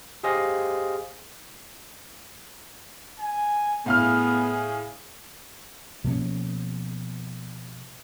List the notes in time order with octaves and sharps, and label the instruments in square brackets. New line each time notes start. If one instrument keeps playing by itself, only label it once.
[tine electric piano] G4 G#4 C5 D#5 F5
[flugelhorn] G#5
[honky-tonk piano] A2 F5 F6 [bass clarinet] B3 [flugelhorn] G#4
[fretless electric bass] B2 F3 A#3 C#4